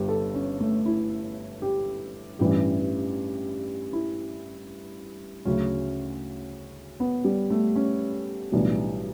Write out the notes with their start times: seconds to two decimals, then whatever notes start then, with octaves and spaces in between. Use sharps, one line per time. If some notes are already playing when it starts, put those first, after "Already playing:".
Already playing: G1 G2 G4
0.09 A4
0.35 C#4
0.61 A3
0.86 E4
1.62 G4
2.39 A1 G2 E3 G3 G4
3.93 E4
5.45 D2 C#3 F#3 C#4
7.00 B3
7.25 G3
7.50 A3
7.76 C#4
8.52 B1 A2 E3 G3 D4